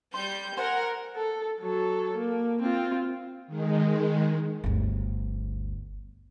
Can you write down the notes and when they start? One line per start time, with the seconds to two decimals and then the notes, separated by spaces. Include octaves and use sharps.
0.14 G3 C6 G6
0.57 A#4 C5 F#5 G#5
1.16 A4
1.60 F#3 A4
2.16 A#3
2.62 C4 F4
3.47 D#3 G#3
4.64 G1 D2